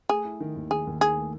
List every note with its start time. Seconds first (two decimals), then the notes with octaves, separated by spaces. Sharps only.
0.09 A3 G#4
0.25 E4
0.40 D#3
0.56 D#2
0.71 D#3 G#4
0.87 D#2
1.01 D#3 G#4
1.17 A3